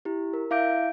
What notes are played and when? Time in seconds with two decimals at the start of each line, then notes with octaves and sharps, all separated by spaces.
0.05 E4 G4
0.33 A#4
0.51 E4 E5 F5 D6 G6 D7